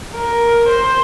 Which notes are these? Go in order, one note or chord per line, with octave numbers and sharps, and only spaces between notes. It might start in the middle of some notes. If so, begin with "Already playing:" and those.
A#4
C5